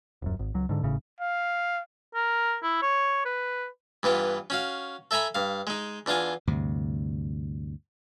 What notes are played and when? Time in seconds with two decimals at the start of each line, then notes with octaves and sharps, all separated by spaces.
0.22 D#1 F#2
0.39 G#1
0.54 C#2 F#3
0.69 G#2 D3
0.82 G#1 A2 C#3
1.21 F5
2.15 A#4
2.63 E4
2.82 C#5
3.25 B4
4.03 G2 E3 B3 F4
4.50 C#4 F#4 F5
5.11 A4 E5 G#5 A#5 B5
5.35 G2 F5
5.67 G#3 D#4
6.06 E2 D4 F4 F5 G#5
6.47 D2 G2 C3